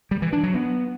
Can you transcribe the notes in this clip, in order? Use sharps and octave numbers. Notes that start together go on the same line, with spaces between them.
G3
E3
D4
F#3
B3